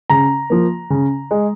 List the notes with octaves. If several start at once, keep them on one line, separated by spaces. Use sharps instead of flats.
C#3 A#5
F3 A#3
C#3
G#3